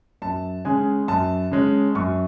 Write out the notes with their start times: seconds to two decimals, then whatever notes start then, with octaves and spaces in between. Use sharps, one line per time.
0.22 F#2 A5
0.65 C#3 G#3 C#4 G#5
1.08 F#2 A5
1.51 C#3 G#3 C#4
1.95 F#2 C#6